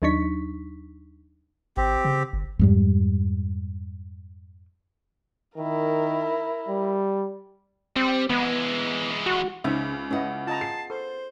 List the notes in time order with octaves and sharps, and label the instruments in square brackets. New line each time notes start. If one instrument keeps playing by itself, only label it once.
[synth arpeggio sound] D#2 F#3 D4 D#4 C#6 B6
[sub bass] G#1 [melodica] C4 G4
[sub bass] C#3
G1
[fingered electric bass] F2 G#2 G3
[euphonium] D#3 [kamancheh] E4 A#4
[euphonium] G3
[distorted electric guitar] G3 [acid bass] C4
[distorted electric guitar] E3 G#3 [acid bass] B3
[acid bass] F#4
[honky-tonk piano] C#2 [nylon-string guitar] C#3 C#4 D#4 [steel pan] C5 E5
[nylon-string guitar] B3 F#5 [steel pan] C#4 E4 D#5
[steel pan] F4 D#5 A#5 [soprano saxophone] A5
[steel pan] G#4 [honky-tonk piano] C7
[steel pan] A4 [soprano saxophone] C5